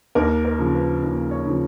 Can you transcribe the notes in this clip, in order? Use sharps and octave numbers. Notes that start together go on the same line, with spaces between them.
D#2 A#4
A#4
C#3 F3
B4
D#2
C#5
C#3 F3